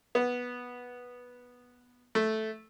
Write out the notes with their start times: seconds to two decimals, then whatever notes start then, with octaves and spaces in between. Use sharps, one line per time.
0.15 B3
2.15 A3